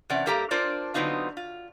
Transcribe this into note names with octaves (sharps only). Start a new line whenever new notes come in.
C3 E3 C#4 D5 F#5
G2 A#3 G4 A4 A5 A#5
D4 F4 A#4 C5 D5
D3 F#3 B3 C4 D#4 F4
F4